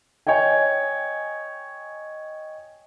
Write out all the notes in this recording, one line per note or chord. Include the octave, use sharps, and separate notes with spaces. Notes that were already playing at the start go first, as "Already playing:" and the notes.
C#5 D#5 G5 G#5